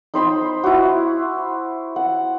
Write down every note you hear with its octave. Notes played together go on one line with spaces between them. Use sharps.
D#4 C5 B5 C6
E4 F#4
F#5